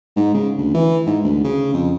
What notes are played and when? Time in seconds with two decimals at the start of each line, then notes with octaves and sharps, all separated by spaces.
0.16 G#2
0.34 C#3
0.58 D2
0.74 E3
1.07 G#2
1.24 D2
1.44 C#3
1.74 F2